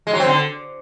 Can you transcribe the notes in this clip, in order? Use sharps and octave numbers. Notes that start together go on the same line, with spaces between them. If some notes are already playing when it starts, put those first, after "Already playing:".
G#3
F#3
C4
D3